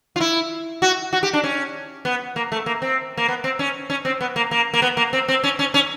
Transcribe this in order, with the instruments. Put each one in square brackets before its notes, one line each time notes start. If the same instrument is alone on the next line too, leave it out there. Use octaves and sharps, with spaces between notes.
[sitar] F4
E4
F#4
F#4
G4
D4
C#4
B3
A#3
A3
A#3
C4
A#3
B3
C4
C#4
C#4
C4
B3
A#3
A#3
A#3
B3
A#3
C4
C4
C#4
C#4
C#4